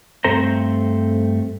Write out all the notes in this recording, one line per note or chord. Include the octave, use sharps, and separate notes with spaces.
G2 A3 C4 A4 C5 A#5